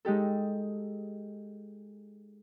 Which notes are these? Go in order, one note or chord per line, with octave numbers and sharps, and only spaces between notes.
G#3 D#4 G4 A4